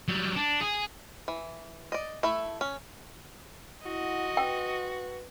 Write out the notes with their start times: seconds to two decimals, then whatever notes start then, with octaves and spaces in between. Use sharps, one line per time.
0.08 F#3 G3
0.36 D4
0.61 G#4
1.28 E3
1.92 D5 D#5
2.23 A3 E4
2.61 C#4
3.86 E4 F#4 D#5 F#5
4.37 B4 G5